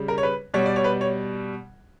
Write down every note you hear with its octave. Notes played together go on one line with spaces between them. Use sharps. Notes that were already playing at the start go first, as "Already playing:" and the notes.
Already playing: C#3 G3
A#4
C#5
B4
B2 G3 C#5
D5
C#5
B4
C#5